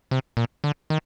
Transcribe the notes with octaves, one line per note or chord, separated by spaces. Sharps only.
C3
A#2
D3
D#3